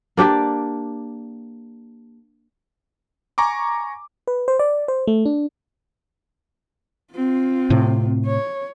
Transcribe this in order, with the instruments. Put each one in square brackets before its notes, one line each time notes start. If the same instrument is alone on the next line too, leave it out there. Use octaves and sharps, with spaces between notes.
[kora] A#3 D4 G4 D5
[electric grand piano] G#5 A#5 C#6 D6
[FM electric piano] B4
C5
D5
C5
A3
D4
[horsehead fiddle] C4 F4
[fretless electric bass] A2 C3
[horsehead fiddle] C#5